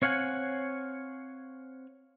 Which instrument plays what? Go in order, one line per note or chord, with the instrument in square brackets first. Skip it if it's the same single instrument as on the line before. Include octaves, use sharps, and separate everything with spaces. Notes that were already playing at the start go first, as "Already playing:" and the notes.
[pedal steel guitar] C4 C#5 F5 F#5 G#5